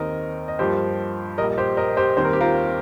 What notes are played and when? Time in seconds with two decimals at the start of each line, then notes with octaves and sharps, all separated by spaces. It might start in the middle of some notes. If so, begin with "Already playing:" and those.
Already playing: D#2 D#3 C4 A#4 D#5
0.48 D#5
0.59 G2 F3 A#3 G4 C5
1.38 A#1 A#2 G3 A#3 A#4 D#5
1.58 G4 C5
1.77 A#4 D#5
1.97 G4 C5
2.17 D#2 D#3 G3 C4 C5
2.25 A#4
2.33 G4
2.41 F4 A#4